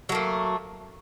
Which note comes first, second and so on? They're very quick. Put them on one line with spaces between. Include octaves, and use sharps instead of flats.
F#3 A3 A#3